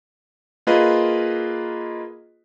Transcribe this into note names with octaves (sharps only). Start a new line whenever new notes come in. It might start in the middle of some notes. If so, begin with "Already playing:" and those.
A#3 F4 G#4 B4 D#5